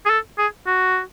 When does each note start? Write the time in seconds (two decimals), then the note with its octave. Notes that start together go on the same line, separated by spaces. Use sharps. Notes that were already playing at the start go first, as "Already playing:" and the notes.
0.05 G#4
0.10 A4
0.38 G#4
0.66 F#4